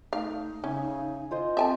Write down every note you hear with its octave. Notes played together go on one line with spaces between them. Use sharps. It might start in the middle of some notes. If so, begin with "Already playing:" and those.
A3 D#4 F5
C#3 C#4 E5 G#5
F4 C5 D#5
C4 A4 E5 G#5 A5